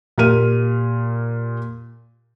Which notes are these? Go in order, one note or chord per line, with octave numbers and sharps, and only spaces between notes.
A#2 G4 A#4 F6 D#7